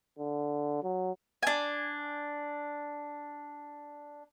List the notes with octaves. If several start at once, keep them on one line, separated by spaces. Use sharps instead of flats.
D3
F#3
D4 G#5